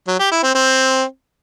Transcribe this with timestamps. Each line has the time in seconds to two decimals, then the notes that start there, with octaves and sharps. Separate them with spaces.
0.08 F#3
0.19 G4
0.31 E4
0.43 C4
0.55 C4